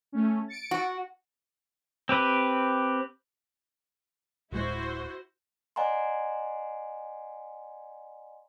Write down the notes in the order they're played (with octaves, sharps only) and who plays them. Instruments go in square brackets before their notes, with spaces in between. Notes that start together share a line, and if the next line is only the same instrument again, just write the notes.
[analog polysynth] A3 C#4
A6 C#7 D7
[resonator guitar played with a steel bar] F#4
[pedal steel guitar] C4 G4 B4
[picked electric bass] D1 G#3 [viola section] E4 F#4 C5
[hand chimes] D5 D#5 F#5 G#5 A#5 C6